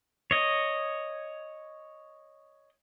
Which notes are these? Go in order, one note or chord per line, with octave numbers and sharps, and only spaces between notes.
C#5 D#5